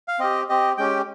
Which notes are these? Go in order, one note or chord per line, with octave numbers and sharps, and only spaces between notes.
F5
C4 G4 D#5
C4 G4 D#5
G#3 C#4 G4 G5